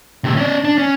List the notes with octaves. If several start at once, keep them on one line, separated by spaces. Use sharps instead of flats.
A2 C3
C#4 D5
D4
C#4